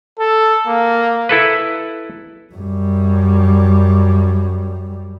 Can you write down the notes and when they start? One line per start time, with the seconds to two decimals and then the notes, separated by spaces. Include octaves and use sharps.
0.19 A4
0.67 A#3
1.29 E4 A4 B4
2.54 F#2 G3